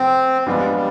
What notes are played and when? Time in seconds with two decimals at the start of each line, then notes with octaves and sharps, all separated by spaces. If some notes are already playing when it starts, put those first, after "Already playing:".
Already playing: C3 F3 A3 C4
0.46 F3 G3 G#3 B3 D4 F4
0.75 G3